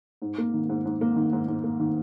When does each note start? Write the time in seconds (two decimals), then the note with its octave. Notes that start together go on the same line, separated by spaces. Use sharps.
0.22 G#2
0.38 A#3
0.54 D#3
0.69 G#2
0.85 G#2
1.01 A#3
1.16 D#3
1.33 G#2
1.48 G#2
1.64 A#3
1.80 D#3